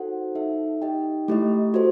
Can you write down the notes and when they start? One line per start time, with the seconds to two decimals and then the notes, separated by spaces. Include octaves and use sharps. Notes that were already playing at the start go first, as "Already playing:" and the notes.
Already playing: D#4 F#4 A4 C5 F#5
0.35 D#4 A4 E5
0.82 D#4 G4 D#5 G5
1.28 A3 E4 G4 D#5
1.74 F#4 A4 C5